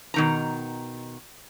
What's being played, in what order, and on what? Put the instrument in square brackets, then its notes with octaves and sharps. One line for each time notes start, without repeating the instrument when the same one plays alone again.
[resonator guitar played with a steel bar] B2 D#3 A#5